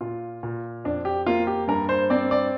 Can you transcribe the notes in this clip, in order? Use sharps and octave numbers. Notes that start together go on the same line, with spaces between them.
A#2 F4
A#2
F2 D4
G4
A#3 F4
G4
G2 A#4
C5
C4 D5
D5